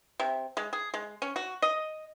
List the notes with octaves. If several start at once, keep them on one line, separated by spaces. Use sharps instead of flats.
C3
G#3
G#4
G#3
C#4
F#4
D#5